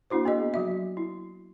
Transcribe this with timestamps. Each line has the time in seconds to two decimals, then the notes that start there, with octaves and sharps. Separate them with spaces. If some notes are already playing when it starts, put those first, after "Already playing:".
0.10 A#3 D4 E4 F#4 C5
0.25 B3 G#4 D#5
0.54 F#3 F#4 E5
0.97 E4